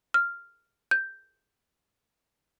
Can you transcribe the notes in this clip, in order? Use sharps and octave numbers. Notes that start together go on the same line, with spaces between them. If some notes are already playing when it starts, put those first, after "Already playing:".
F6
G6